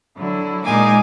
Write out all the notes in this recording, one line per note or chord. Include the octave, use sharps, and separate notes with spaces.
D3 F#3 E4
A#2 G#3 A#3 D#4 G#5 D6